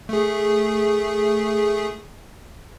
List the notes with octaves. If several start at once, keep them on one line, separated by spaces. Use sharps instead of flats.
A3 G#4